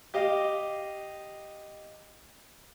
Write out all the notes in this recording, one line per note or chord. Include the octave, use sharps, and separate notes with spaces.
G4 D#5 F5